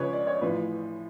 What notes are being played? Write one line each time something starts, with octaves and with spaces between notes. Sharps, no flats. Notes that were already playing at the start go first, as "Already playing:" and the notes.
Already playing: C#2 C#3 F3 B4 C#5
D5
C#5
A1 A2 F3 B4